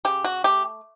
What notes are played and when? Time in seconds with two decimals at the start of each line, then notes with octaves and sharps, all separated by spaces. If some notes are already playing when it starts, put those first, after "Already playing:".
0.05 C#3 G4
0.24 F#4
0.44 A3 G4